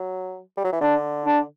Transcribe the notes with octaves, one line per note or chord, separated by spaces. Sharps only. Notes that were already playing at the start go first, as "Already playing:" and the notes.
Already playing: F#3
G3
F#3
E3
D3 D4
D4